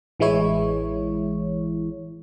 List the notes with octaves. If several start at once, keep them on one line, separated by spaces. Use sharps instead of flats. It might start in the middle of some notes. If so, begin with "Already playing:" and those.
A1 E3 G#3 E4 C#5